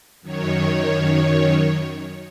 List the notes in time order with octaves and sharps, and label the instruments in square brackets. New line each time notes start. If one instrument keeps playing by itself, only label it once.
[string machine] F#2 D#3 C#5